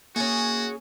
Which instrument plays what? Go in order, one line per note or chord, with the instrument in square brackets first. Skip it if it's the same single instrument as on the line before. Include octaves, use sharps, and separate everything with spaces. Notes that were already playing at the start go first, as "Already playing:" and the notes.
[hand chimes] A#3 A6 [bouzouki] C#4 G#4 [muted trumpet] F#4